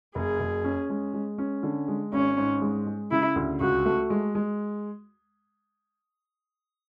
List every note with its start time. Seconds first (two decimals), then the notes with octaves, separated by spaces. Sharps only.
0.15 F#1 G#4
0.40 F#1
0.64 C#4
0.89 G#3
1.14 G#3
1.38 C#4
1.63 D3
1.88 G#3
2.13 G#1 C#4
2.38 G#2
2.62 G#3
2.86 G#3
3.11 C#3 E4
3.36 D2
3.60 C#2 F#4
3.86 A3
4.10 G#3
4.35 G#3